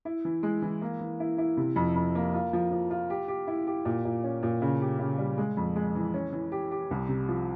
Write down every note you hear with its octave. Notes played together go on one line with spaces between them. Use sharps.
E4
E3
G#3
E3
A#3
E3
E4
E4
C3
F2
F2
A#3
F4
F3
F3
F4
G4
G4
E4
G4
A#2
A#2
C#4
A#2
C#3
G4
C#3
G3
G#3
F2
G#3
E3
C#4
E3
G4
G4
C2
C3
F3